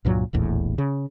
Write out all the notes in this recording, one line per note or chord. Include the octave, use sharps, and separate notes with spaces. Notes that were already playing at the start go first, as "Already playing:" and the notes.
C#2 G2 A#2 F#3
D#1 A#1 E2 A2
C#3